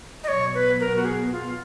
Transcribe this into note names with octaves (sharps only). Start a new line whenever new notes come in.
D#5
B2 F#3 B3 C#5
B4
A#4
F#4
G#4
F4